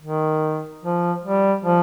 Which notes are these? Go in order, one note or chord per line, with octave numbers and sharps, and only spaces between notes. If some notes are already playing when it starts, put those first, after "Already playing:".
D#3
F3
G3
F3